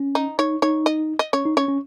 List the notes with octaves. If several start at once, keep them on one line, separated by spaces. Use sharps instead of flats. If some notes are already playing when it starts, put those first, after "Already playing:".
Already playing: C#4
D#4
D#4 C#5
D#4 C#5
D#5
D#5
C#4 C#5
D#4
C#4 C#5
C#4